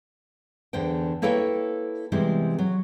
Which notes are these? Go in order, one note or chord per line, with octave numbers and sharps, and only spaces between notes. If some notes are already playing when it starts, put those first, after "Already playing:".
E2 D3 C5 G5
A#3 E4 A4 B4 C#5 G5
C3 E3 G3 G#3 B3 C4
F#3